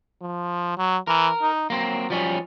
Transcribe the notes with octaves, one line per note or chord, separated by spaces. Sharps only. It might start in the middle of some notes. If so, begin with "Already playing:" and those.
F3
F#3
E3 A#4
D#4
F#3 A#3 C4
F3 G3 C#4